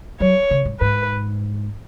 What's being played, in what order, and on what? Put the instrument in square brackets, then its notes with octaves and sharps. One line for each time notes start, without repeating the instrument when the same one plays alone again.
[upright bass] F#3 [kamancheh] C#5
[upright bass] C#3
G#2
[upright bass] G#2 [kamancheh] B4